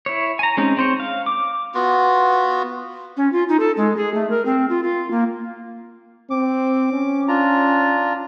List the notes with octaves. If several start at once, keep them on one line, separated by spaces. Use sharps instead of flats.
E4 C#5
G#5 A#5
G#3 C4 C#4 D#4
C4 C5 C#5
F5
D6
B3 F4 F#4
C#4
F4
D#4
A4
G#3
G#4
A3
A#4
C4
F4
F4
A#3
C4 D6
C#4
D4 F4 A#5